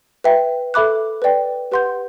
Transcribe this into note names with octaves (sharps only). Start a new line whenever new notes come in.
B4 E5 G5
A4 E5 B5 D6 F#6
B4 D5 G5
G4 B4 F#5 C6 G6